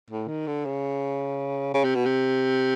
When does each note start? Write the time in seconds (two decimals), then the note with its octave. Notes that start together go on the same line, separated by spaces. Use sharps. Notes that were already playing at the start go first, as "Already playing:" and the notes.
0.10 A2
0.28 D#3
0.47 D3
0.65 C#3
1.74 C#3
1.84 C3
1.95 B2
2.05 C3